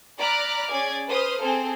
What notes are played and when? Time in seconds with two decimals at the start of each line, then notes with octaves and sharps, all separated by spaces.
0.19 D5 A#5 B5 D6 F6 F#6
0.70 C#4 G#4 D5 G#6
1.09 B4 C5 D#6 F6
1.41 C4 G#4 A4 C5